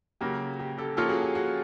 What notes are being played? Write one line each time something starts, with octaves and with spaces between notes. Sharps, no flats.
C#3 F#3 A#3 G4
G4
G4 A4
F3 A#3 C#4 F4 G4 A4
F#4 G#4
G4
F#4 G#4